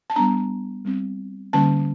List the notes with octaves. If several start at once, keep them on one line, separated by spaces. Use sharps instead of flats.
A5
G3 B3 D4 A#5
G3 C4
D3 G3 A#3 C#4 A5